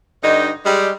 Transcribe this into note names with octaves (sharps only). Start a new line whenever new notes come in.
G2 D3 D#4
G3 G#3